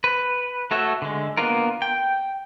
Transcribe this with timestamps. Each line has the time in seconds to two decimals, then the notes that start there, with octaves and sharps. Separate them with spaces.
0.04 B4
0.71 A3 F#4 A4 C#5 E5
1.02 D3 G#3
1.37 A#3 B3 D4 F4 A#4
1.82 G5